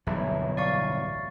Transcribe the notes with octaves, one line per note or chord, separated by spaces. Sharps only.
D1 B1 G2 E3
D5 F5 C#6